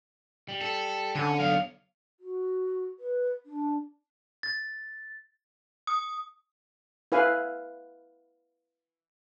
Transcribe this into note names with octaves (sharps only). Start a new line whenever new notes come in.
G3
A4
D3 C#5 G#5
F#3 B3 F5
F#4
B4
D4
A6
D#6
E4 B4 F5 G#5